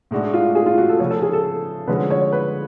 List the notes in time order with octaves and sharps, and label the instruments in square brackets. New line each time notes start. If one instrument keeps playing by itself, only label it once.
[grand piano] A2 G#3 D4 F#4
[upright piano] F4
G#4
F4
F#4
A4
[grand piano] C#3 F3 B3 [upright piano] C#5
[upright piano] A4
G#4
A4
[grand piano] D3 F3 G#3 C#4 F#4 [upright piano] B4
[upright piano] C#5
B4